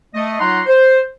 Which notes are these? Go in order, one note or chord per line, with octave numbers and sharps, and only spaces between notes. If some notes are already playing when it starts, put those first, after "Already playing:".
A3 D#5
F#3 D#4 F4 F#5 A#5 C6
C5